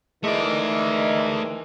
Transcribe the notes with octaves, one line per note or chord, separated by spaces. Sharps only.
D#3 E3 G#3 A3 D5